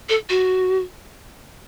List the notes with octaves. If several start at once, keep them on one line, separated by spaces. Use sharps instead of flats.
A4
F#4